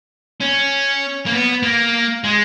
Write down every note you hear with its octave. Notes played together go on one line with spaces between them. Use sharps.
C#4
A#3
B3
A#3
G#3